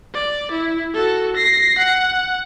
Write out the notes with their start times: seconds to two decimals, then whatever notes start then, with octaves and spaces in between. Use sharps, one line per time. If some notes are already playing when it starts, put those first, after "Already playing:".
0.14 D5
0.52 E4
0.94 F#4 A4
1.36 A#6 C7
1.79 F#5